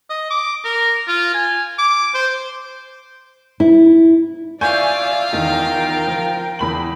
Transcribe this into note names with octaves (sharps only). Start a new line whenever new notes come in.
D#5
D6
A#4
F4
G#5
D6
C5
E4
F4 D5 E5 F5 G#5 C#6 G6
E2 D#3 D#4 A#4 G5
F3
E2 B5 F#7